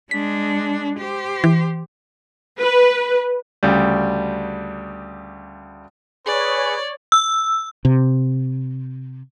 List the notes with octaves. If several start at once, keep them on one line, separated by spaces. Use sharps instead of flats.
G#3 D4 B6
G4 C5
E3
B4
D2 C#3 G3
G#4 B4 C#5 D5
E6
C3